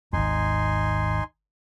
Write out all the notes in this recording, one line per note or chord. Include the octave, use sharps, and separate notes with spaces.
G#1 D#2 D#4 G#5 C6